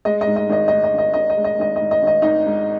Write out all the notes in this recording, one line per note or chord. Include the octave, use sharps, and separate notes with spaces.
G#3 D#5
D#5
G#2
D#5
G#1 D#5
D#5
G#2
D#5
G#1 D#5
G#1 D#5
D#5
G#3
D#5
G#1 D#5
D#5
G#2
D#5
G#1 D#5
G#1 D#4 D#5
G#2